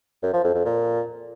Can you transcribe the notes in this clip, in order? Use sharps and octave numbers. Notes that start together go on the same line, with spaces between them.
F#2
F3
F2
F2
A#2